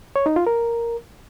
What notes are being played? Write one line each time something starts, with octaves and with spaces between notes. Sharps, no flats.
C#5
D#4
F4
A#4